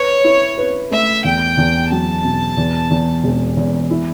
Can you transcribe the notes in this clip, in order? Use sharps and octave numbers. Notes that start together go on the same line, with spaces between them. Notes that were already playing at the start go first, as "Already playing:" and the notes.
Already playing: B4 C#5
E4
B4
A3 E5
E2 G5
E2
F#3 A5
B2
E2
E2
E1
E2
E4